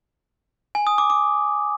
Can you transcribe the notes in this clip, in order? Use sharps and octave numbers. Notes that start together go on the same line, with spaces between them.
G#5
D#6
D6
D6